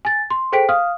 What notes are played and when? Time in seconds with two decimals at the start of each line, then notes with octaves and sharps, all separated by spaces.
0.05 G#5 A6
0.30 C6
0.52 G#4 A4 C5 G5 B6 D7
0.69 F5 D#6 F6